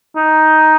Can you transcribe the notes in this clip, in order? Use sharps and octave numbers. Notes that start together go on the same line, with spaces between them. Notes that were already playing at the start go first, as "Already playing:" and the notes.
D#4